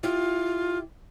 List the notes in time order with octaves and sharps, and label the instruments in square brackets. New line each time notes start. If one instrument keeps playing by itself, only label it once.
[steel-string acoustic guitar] E4 G4 [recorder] F4